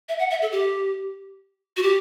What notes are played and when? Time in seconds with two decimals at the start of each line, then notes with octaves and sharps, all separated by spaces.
0.09 E5
0.19 F#5
0.31 E5
0.42 A4
0.52 G4
1.77 F#4
1.83 G4